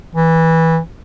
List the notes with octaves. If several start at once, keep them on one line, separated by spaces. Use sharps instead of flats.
E3